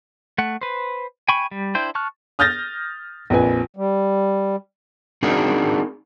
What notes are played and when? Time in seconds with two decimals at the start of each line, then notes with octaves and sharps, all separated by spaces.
0.38 A3 F#5
0.61 B4 C5
1.29 G5 G#5 B5 C#6
1.51 G3
1.75 D4 E4 C5 G5
1.95 A5 C#6 F6 F#6
2.39 D#6 F6 G6 A6 A#6
3.30 A#1 F2 A#2 B4 G#5
3.77 G3
5.23 C4 D4 D#4 F#4 G#4 A#4